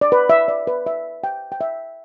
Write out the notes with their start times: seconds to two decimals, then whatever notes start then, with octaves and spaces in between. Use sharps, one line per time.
0.01 D5
0.12 B4
0.30 E5
0.48 D5
0.67 B4
0.86 E5
1.24 G5
1.52 G5
1.61 E5